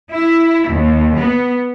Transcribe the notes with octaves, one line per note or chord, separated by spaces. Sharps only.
E4
D#2
B3